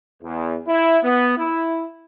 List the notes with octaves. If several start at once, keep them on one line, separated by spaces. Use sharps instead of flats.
E2
E4
B3
E4